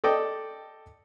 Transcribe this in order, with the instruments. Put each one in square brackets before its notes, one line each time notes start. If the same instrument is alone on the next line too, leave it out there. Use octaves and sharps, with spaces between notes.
[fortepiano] A4 D5 D#5 G5